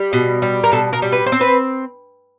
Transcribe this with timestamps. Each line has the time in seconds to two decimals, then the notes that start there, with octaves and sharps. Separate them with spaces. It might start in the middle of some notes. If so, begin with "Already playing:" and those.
Already playing: G3
0.13 B2
0.42 G3
0.64 A#4
0.72 B2 A4
0.93 A#4
1.02 G3
1.12 B4
1.26 C5
1.32 C4
1.41 B4